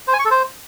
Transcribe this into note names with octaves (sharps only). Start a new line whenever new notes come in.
C5
G#5
C#6
A4
C5